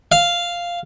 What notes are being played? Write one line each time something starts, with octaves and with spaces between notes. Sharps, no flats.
F5